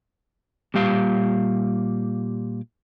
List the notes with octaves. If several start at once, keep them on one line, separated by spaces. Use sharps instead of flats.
A#2 G3 G4 F5